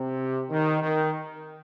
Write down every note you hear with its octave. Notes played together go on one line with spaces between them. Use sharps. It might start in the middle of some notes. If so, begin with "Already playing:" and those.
Already playing: C3
D#3
D#3